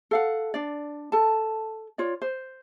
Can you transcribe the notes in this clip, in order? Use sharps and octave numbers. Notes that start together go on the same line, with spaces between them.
A4 F5 F#5
D4 D5
A4 A5
F4 C#5 D5
C5